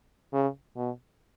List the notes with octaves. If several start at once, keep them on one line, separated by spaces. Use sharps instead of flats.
C#3
B2